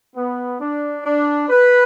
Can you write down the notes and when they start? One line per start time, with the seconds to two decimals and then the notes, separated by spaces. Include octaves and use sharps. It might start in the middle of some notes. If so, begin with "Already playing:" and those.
0.16 B3
0.61 D4
1.06 D4
1.49 B4